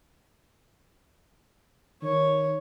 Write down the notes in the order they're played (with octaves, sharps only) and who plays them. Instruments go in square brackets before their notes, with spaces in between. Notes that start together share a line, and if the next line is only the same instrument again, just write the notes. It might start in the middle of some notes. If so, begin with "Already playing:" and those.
[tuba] D#3 [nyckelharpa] C#5